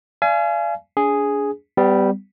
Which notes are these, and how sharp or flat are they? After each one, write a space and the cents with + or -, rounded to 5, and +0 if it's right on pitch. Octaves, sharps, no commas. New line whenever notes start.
D5 +0 F5 -35 G#5 +25
D4 -35 G#4 +0
G3 +0 B3 +35